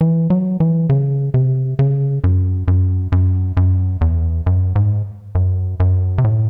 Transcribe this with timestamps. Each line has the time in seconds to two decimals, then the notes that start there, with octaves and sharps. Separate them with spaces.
0.01 E3
0.30 F#3
0.60 E3
0.90 C#3
1.34 C3
1.79 C#3
2.24 F#2
2.68 F#2
3.12 F#2
3.57 F#2
4.01 E2
4.46 F#2
4.76 G#2
5.35 F#2
5.80 F#2
6.18 C3
6.24 A2